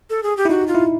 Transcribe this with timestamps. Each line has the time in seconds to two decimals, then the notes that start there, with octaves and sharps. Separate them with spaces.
0.10 A4
0.23 G#4
0.37 G4
0.45 E4
0.50 D#4 F#4
0.67 F4
0.75 E4